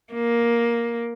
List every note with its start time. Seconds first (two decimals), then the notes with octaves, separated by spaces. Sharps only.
0.13 A#3